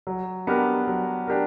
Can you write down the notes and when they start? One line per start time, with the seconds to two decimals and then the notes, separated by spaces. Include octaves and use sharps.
0.07 F#3
0.47 B3 D4 G4 A#4
0.87 F#3
1.28 D4 G4 A#4